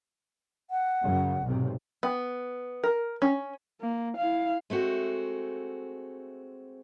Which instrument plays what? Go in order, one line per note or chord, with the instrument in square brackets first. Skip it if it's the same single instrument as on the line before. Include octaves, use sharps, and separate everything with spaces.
[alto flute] F#5
[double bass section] F#2 C#3
B1 G#2 C3
[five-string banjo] B3
A#4
C#4
[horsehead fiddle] A#3
E4 F5
[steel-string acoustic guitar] G#3 A3 C4 F#4